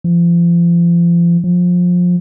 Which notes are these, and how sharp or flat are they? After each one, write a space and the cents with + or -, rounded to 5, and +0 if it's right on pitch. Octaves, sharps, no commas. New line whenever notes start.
F3 -35
F3 +25